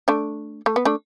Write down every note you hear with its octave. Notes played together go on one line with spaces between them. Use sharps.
A3 D4
A3
B3
A3 D4